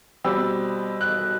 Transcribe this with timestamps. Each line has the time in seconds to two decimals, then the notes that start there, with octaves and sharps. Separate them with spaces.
0.24 B2 G3 C4 E6
1.01 F#6